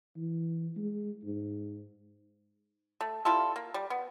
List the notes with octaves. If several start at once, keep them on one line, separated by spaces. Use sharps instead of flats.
E3
G#3
G#2
A3
G3 E4 F4 A4
A#3
G3
B3